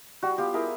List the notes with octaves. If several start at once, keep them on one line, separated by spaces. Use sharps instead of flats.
G3 F#4
B3 F4 G4
E4 G#4 A#4